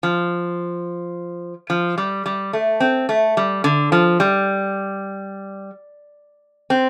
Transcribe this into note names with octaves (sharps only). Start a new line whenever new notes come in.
F3
F3
G3
G3
A3
C4
A3
G3
D3
F3
G3
C4